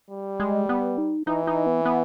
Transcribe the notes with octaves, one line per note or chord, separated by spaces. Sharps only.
G3
G#3
B3
D#4
E3 D#4
D#4
B3
B3